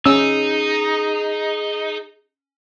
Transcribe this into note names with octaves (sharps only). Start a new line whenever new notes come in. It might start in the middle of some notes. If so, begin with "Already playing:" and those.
C#4 D#4 G#4 E6